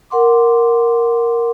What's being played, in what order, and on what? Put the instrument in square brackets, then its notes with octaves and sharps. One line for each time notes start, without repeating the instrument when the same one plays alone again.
[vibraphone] A#4 F#5 C6 D6